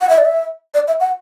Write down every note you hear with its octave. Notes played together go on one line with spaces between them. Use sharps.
F#5
E5
D5
E5
D5
E5
F#5